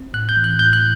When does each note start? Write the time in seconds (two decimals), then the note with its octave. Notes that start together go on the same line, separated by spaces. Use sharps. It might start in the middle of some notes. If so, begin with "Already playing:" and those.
Already playing: C4
0.14 A2 F#6
0.29 G6
0.37 E3
0.44 F#6
0.59 A2 G6
0.73 F#6